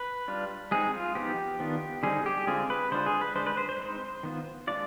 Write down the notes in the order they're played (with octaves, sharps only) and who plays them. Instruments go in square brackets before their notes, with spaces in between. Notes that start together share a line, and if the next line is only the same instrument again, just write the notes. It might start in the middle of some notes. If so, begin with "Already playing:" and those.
Already playing: [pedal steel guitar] B4
G3 D4 F4
G#3 C4 D#4 G#4
F4
F3 B3 D#4 G4
D#3 B3 D4 F4
D3 G3 C4 D#4 G#4
G4
D3 G#3 C4 F4 G#4
B4
D3 G#3 D4 F4 C5
G#4
B4
D3 G#3 D4 C5
B4
C5
C5
G#3 C4 D#4
D#3 B3 F4
G#3 D4 F4 D5